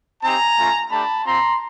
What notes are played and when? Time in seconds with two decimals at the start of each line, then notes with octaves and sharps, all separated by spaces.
0.22 C4 D#4 G4 G#5 A#5
0.56 A3 C#4 F4
0.90 A3 D4 G4 A5 B5
1.24 C4 F4 A#5 C6